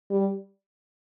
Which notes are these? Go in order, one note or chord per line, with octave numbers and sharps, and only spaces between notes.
G3